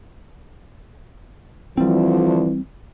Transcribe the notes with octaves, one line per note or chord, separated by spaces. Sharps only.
D2 E3 F3 G3 C4